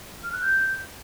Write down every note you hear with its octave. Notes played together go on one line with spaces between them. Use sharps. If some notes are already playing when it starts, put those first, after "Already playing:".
F6
F#6
G6